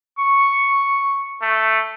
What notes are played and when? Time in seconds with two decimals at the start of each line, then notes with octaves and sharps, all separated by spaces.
0.19 C#6
1.42 A3